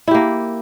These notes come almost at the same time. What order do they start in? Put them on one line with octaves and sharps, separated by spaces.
E4 G4 A#3